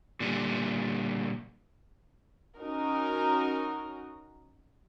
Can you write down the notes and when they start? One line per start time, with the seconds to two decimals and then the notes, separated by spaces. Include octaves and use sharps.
0.20 A#2 D3 G3
2.59 C#4 D#4 F#4 A#4